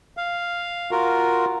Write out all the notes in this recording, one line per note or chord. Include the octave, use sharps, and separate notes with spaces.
F5
F4 F#4 A#4